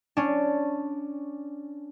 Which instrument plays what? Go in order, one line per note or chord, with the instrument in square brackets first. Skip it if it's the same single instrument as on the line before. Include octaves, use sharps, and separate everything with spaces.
[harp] C#4 D4